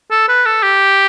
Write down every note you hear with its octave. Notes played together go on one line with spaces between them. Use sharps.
A4
B4
A4
G4